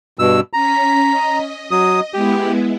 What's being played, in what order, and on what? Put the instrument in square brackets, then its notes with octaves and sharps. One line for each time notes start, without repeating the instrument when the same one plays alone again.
[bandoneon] G2 B2 E6
[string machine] C#4 B6 [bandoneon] A#5
[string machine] D#5
[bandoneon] F#3 D#6
[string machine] G#3 B3 E4 [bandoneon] G4